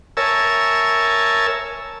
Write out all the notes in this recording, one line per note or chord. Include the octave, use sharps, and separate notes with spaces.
A#4 C#5 E5 G#5 A5 E6